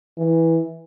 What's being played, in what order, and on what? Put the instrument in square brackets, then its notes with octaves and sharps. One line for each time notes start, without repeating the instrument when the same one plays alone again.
[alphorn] E3